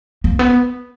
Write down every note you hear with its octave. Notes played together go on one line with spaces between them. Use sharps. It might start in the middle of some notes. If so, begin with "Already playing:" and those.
A#3
B3